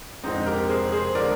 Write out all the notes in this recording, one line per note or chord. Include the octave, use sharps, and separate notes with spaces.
F2 D3 F3 G#3 C4 D#4
G4 A#4
A#4
G#4 C5
G#4 C5
D3 F3 G#3 A#4 D5